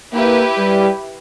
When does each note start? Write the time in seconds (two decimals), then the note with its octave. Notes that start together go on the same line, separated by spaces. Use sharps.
0.13 A#3 E4 G4 B4
0.58 G3